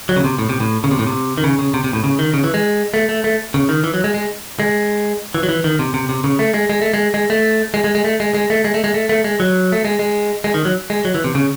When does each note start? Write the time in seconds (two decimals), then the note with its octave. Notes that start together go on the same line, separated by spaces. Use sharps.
0.09 F#3
0.16 C#3
0.24 C3
0.39 A2
0.49 C3
0.60 A2
0.84 C#3
0.91 C3
0.99 A2
1.07 C3
1.38 D#3
1.44 C#3
1.59 C#3
1.74 C3
1.84 C3
1.93 A2
2.04 C#3
2.19 D#3
2.34 C#3
2.44 E3
2.54 G#3
2.94 A3
3.09 A3
3.24 A3
3.54 C#3
3.69 D#3
3.84 E3
3.94 F#3
4.04 G#3
4.14 G#3
4.60 G#3
5.35 E3
5.43 F#3
5.49 E3
5.64 D#3
5.79 C3
5.94 C3
6.09 C3
6.24 C#3
6.39 A3
6.54 G#3
6.70 G#3
6.82 A3
6.94 G#3
7.14 G#3
7.30 A3
7.74 G#3
7.84 G#3
7.95 G#3
8.04 A3
8.20 G#3
8.35 G#3
8.50 A3
8.65 G#3
8.74 A3
8.84 G#3
8.94 A3
9.09 A3
9.24 G#3
9.40 F#3
9.72 A3
9.85 G#3
9.99 G#3
10.44 G#3
10.54 D#3
10.65 F#3
10.90 G#3
11.05 F#3
11.15 E3
11.24 C3
11.35 C#3